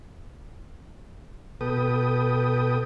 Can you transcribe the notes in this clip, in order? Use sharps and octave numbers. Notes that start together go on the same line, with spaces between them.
B2 A4 B4 G5 D#6